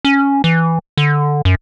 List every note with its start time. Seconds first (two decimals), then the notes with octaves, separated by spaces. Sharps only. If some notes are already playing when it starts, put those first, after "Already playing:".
0.05 C#4
0.44 E3
0.97 D3
1.45 F#2